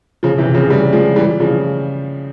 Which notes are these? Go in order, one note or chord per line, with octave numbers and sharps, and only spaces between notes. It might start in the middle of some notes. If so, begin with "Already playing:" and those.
C#3 F3
C3 E3
C#3 F3
E3 G3
F3 G#3
E3 G3
C#3 F3